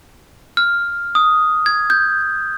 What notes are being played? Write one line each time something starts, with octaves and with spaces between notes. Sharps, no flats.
F6
D#6
G#6
G6